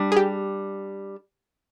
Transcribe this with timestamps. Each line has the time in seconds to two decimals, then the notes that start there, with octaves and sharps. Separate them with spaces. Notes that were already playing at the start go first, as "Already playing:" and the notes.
Already playing: G3 D4
0.12 G#4
0.16 G4